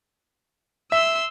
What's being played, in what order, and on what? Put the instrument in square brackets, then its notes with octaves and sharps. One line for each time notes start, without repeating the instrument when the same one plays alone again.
[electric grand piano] E5 [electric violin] C6 E6